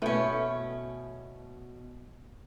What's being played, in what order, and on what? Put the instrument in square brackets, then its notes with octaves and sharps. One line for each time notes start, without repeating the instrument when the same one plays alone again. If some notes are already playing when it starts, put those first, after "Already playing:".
[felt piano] B2 [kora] A3 E4 G5 [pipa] B3 C#4